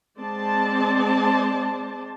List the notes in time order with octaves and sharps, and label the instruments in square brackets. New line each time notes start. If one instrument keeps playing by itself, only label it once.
[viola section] G#3 C4 C5 D5 A5